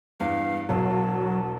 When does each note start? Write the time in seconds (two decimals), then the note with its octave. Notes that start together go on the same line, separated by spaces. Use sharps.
0.20 E2 G2 F5
0.69 E1 B1 F#3 A5